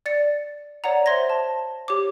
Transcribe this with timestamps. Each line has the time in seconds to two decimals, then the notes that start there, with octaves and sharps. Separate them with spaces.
0.06 D5 A6 C#7
0.84 C#5 D5 F#5 A#5
1.06 C5 E5 C6 G#6 A#6
1.30 A5
1.88 G4 C#5 D6